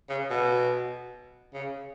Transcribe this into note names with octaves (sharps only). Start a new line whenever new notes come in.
C#3
B2
C#3